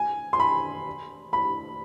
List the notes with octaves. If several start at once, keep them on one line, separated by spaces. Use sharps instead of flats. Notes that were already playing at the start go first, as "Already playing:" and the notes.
Already playing: G#5
C6
B5
B5